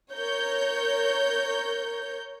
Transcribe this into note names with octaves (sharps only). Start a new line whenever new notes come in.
A#4 C#5 G6